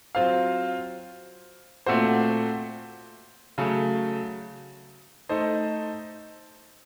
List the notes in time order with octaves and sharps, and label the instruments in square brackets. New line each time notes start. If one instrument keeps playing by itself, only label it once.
[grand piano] F#3 C4 F4 C5 F5
A#2 A3 C4 F#4 C5
C#3 F#3 A3
A3 D#4 A4 C5 D#5